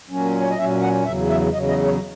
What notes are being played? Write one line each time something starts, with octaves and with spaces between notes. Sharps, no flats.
A#2 F#3 C#4
C#5
D#5
A#2 F#3 C#4 E5
F#5
E2 C#3 F#3 E5
E5
E2 C#3 F#3 D#5
D#5
C#5